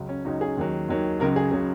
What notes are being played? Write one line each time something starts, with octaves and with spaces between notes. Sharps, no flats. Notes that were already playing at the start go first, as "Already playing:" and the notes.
Already playing: C#2 C#3 F#3
C#4
C#2 C#3 F#3 D#4
G#4
D#2 D#3 F#3
D#2 D#3 F#3
C#2 C#3 F#3 A#4
G#4
C#3 F#3 G#4